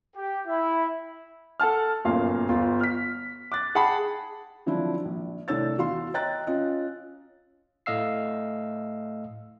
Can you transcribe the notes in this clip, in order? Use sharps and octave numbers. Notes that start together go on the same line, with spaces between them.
G4
E4
A4 F#5 A5 F6
G1 F#2 A#2 F5
G1 F4
F6 B6
D6 F#6 A6
G#4 F#5 G5 A5 B5
D3 F3 F#3 C4 D4 E4
A#1
C2 A3 D4 C#5 E6 A6
E2 F#4 F5 C6
C#5 D#5 G5 A#5 F#6 A6
C#4 F4 D#5
A2 A3 D#5 F5 E6 C7